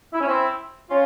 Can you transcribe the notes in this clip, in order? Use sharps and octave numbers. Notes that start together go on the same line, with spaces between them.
E4
C#4
C4 E4
C#4 F4